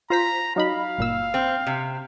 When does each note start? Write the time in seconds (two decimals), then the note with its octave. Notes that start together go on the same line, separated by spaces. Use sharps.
0.10 F4 C5 A#5 B6
0.56 F#3 D#4 F5 B5
0.98 G1 A#2 E6
1.34 C4
1.67 C3